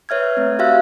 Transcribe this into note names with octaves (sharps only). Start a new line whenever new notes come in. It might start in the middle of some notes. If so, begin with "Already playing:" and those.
B4 C#5 E5 F6 G#6
A3 C4
F#4 G4 E5 F5 E6 F#6